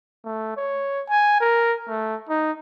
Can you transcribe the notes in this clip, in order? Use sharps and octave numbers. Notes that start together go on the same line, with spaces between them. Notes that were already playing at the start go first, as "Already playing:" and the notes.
A3
C#5
G#5
A#4
A3
D#4